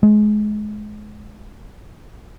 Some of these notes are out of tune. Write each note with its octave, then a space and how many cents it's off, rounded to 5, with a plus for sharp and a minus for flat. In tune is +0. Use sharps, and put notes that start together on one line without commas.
G#3 +25